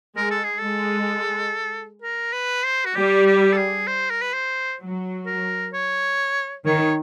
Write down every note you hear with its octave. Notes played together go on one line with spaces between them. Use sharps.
G#3 A#4
A4
G#4
G#3 A4
A#4
B4
C5
F#4
G3 G4
G4
A4
G#4
C5
A#4
B4
C5
F#3
A#4
C#5
D#3 C#5